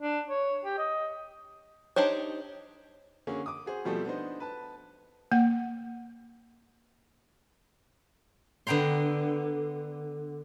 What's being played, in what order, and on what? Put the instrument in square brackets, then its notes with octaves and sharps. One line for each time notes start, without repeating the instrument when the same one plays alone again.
[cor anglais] D4
C#5
G4
D#5
[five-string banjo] D4 D#4 G4 C5 C#5
[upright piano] D3 A#3 C#4 G#4
D6 D#6
F#4 G#4 C5
B2 F3 G3 A3 C4 A4
B3 D4 D#4 C5
B4 A5
[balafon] A#3 F#5
[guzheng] D3 B3 G5 A#5 C6